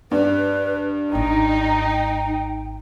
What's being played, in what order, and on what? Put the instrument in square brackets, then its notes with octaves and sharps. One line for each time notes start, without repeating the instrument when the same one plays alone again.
[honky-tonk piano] G2 [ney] B4
[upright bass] G#1 G#2 [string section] D#4 [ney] G5